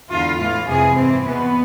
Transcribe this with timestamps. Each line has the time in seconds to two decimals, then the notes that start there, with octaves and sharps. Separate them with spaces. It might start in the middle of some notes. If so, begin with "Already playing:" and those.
0.11 E2 D3 F4
0.39 A2 E3 F4
0.67 F2 C3 E3 G#4
0.96 G#2 E3 C4
1.25 E2 B2 B3